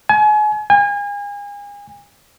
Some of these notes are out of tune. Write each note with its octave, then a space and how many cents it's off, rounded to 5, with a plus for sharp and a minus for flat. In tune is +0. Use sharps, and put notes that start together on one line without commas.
G#5 +35
G#5 -35